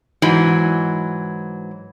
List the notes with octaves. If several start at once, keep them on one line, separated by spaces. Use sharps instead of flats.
G#2 E3 F#3